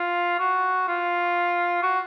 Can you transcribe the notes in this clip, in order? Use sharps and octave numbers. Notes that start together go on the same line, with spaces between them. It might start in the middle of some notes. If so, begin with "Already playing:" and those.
Already playing: F4
F#4
F4
F#4